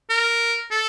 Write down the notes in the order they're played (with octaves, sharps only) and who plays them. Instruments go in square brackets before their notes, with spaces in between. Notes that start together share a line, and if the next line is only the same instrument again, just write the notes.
[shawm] A#4
A4